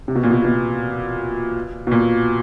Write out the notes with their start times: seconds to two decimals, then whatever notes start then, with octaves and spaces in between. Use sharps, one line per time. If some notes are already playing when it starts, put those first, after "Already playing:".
0.08 C3
0.15 B2
0.23 A#2
0.31 B2
0.45 B2
1.87 B2
1.91 A#2